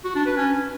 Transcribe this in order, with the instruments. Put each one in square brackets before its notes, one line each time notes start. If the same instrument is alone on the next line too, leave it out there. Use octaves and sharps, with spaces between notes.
[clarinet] F#4
D4
B4
C#4